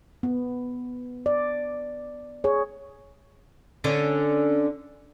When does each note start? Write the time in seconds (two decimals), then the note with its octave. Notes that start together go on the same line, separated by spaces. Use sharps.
0.23 B3
1.26 D5
2.44 G#4 C#5
3.84 D3 C#4